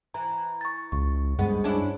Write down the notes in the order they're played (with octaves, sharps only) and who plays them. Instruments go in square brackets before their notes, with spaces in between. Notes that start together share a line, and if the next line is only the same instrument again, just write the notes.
[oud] E3 [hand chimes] A#5
[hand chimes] C#6 A6
[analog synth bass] C#2 [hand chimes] C#6
[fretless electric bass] G2 [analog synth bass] G#3 [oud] B3
[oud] C#4 D4 E4